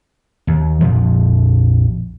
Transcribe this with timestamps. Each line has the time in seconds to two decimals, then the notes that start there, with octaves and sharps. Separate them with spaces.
0.47 D#2
0.81 A#1 F2 F3